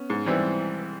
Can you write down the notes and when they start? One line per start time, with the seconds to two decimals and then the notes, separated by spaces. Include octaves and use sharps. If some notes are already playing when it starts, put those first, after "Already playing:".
Already playing: B3 C#4
0.10 G#2
0.26 E3 G3 C4 E4